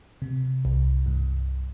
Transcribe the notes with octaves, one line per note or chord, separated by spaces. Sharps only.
C3
C2
G2